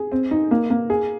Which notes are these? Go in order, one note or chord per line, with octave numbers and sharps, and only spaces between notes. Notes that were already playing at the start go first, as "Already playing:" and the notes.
Already playing: G#4
C4
D#4
A#3
A#3
G#4